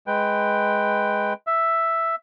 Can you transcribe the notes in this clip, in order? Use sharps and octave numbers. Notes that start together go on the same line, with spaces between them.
G#3 B4 G5
E5